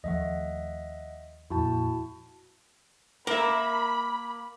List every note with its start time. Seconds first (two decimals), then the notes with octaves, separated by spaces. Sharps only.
0.04 D#2 F3 A3 D#5 E5 F#5
1.50 F2 A#2 E4 F#4 A5
3.27 A#3 A#4 E5 B5